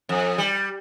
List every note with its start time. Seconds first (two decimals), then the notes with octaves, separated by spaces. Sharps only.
0.09 F2
0.38 G3